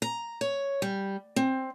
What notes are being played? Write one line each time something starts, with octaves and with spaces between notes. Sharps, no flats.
A#5
C#5
G3
C4